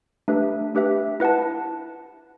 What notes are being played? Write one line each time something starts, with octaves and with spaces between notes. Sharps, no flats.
A3 D4 G4 B4 E5
A3 D4 G4 B4 E5
E4 B4 F#5 A5